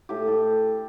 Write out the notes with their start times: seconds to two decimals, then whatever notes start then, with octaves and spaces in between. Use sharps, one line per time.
0.09 A2 G4
0.27 A2 A4